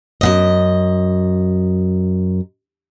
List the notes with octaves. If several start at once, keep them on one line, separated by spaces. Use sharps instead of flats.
F#2 B2 D#5